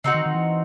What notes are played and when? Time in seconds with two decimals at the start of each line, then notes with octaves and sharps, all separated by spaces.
0.04 C#3 C4 D#4 F#4
0.14 D#3
0.26 D#3
0.35 E3